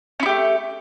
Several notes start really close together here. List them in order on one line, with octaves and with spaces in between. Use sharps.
C#4 E4 G4 A3